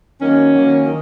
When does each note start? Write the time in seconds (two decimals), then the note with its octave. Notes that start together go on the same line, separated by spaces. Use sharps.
0.20 D#3 F#3 A#3 C#4
0.54 D#3 F#3 A#3
0.86 D#3